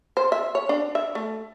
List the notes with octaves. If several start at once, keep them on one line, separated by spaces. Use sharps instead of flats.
C5
E5
C#5
D4
E5
A3